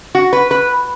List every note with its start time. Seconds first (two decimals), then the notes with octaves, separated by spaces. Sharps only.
0.15 F#4
0.33 B4
0.51 B4